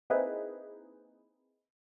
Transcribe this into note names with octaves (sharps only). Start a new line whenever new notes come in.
A#3 C4 D#4 E4 G#4 B4